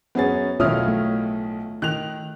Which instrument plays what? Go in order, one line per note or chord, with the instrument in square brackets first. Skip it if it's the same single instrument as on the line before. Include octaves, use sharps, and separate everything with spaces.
[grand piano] F#2 C#4 A6 [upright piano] B3 G#4
[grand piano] B1 A2 D#3 [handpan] F4 C#5 E5 [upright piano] D#6 F6
[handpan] A3
[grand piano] D#3 [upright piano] F#6 F7